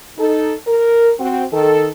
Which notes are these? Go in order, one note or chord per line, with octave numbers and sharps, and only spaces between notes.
D#4 A4
A#4
C4 F#4
D#3 A4